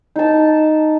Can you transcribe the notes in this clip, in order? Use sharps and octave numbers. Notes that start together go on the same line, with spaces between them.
D#4 A5